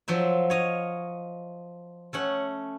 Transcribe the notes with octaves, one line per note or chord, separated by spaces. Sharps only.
F3 F#3 C5 E5
C#5 D#5 F5
A3 C#4 F#5